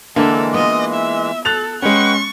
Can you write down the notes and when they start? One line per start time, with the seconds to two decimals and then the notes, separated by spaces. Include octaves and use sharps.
0.16 D3 E3 G#3 A#3 E4 A4 B4
0.54 B3 E4 F4 D#5
0.94 E5
1.45 A4 F#6 A6 F7
1.82 G#3 C#4 B4 F#5 G5 C#6